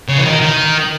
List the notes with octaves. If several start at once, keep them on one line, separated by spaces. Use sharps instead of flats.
C#3
E3
D#3
D#3